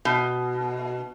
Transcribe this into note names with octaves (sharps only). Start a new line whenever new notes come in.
B2